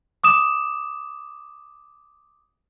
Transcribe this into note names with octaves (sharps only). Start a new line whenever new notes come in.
D6 D#6 E7